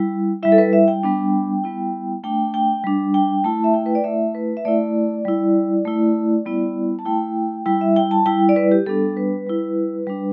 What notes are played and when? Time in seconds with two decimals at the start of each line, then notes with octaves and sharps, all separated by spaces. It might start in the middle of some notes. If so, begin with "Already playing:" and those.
Already playing: G3 E4
0.43 G3 E4 E5
0.52 A4
0.58 B4
0.73 E5
0.88 G5
1.03 G3 B3 D4
1.64 G3 B3 E4
2.24 A3 D4 G5
2.54 G5
2.84 G3 D4
3.14 G5
3.44 A3 E4 A5
3.64 E5
3.74 G5
3.86 B4
3.95 D5
4.04 A3 E4 E5
4.35 B4
4.57 E5
4.65 A3 E4 D5
5.25 G3 E4
5.85 A3 E4
6.46 G3 B3 E4
6.99 A5
7.05 A3 E4 G5
7.66 G3 E4 G5
7.81 E5
7.96 G5
8.11 A5
8.26 G3 E4 G5
8.49 D5
8.56 B4
8.71 G4
8.86 G3 B3 D4 A4
9.17 B4
9.47 G3 E4
10.07 G3 D4